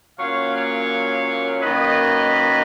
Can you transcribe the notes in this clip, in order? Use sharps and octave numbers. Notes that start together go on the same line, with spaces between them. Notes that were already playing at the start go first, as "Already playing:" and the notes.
A#2 F#3 A#3 C#4 C#5 F5
C#5 F5
F#2 D#3 A#3 D#4 B4 D#5